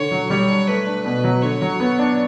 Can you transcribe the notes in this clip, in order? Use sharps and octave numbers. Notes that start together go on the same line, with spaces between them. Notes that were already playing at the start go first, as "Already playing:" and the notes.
Already playing: D3 C#5
F#3
G3 C#5
D4
A3 B4
D4
B2 B4
F#3
D3 C#5
F#3
B3
D4